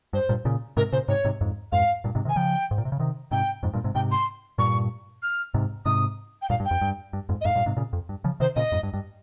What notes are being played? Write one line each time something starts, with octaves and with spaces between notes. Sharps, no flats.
G2 C5
G2 A#2
A#2 C#3
G#2 C3 A#4
A#2 C#3 C5
G#2 C3 C#5
G#2 C3
F2 G#2
F2 G#2 F5
G2 A#2
G#2 C3
C3 D#3
G#5
C#3 F3 G5
G#2
A#2
C3
C#3
C3 D#3
G#2 C3 G5
F2 G#2
G2 A#2
G#2 C3
G#2 C3 G5
C6
G2 A#2 C#6
F6
G#2 C3
G#2 C3 D#6
G5
G2 A#2 F5
G2
G5
F2
G2
G2
F2 G#2
D#5
F2 G#2 F5
G2 A#2
G#2 C3
A#2 C#3
F2
G2
C#3 F3
C3 D#3 C5
A#2 C#3 D#5
F2 G#2
G2
G2